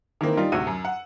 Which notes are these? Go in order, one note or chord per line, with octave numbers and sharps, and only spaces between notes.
D#3 E3 A#3 C4
G3 D#4 F4
D2 A2 C3 F#4 E6 D#7
F#2
F#5